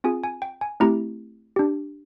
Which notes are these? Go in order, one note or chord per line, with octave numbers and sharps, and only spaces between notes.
C4 F4 G#4 G#5
G#5
G5
G#5
A3 C4 E4 G4 A#5
D4 G4